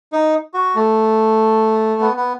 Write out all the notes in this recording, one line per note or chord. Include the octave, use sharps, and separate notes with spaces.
D#4
F#4
A3
B3
B3